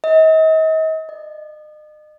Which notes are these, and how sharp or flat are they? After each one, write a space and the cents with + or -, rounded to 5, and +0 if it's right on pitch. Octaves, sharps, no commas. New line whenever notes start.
D#5 +40
D#5 -40